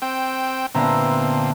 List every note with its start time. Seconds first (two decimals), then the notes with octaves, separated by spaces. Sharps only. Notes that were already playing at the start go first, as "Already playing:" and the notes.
0.02 C4 G5 E6
0.75 A#2 D3 B3 C4 D4 E5 A#5